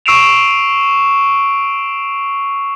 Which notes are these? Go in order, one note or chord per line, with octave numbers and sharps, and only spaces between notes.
C#6 E6 C7 D7 E7 F7